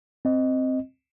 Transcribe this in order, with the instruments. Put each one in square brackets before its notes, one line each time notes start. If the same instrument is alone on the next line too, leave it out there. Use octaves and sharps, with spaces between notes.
[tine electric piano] C4 D#5